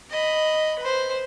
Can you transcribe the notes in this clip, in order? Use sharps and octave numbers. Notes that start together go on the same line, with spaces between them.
D#5 B5
B4 C5